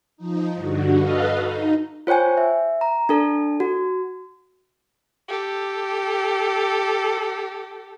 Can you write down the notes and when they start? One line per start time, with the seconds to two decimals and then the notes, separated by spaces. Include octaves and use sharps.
0.17 F3 D#4
0.54 G2 D3 F#4
0.94 F#4 A4 B4 D#5 F5
1.35 D#4
2.07 F4 C5 C#5 G5 G#5
2.37 E5
2.81 A#5
3.09 D4 A4 A5
3.60 F#4
5.28 G4 A4